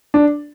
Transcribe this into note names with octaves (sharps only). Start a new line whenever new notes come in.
D4